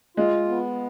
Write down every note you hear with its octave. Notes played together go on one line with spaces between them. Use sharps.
G#3 F4
B3